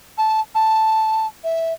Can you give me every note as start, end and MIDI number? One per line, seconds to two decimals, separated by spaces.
0.18 0.41 81
0.55 1.27 81
1.44 1.73 76